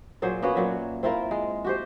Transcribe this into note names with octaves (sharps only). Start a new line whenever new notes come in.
A#2 F#3 G#4 C5
A#3 B3 C#4 F#4
A#2 F#3 E5
C4 E4 F4 A#4
G#3
F#4 G4 C5